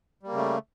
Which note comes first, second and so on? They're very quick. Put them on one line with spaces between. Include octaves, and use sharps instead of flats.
G3 A#3 C#3 A3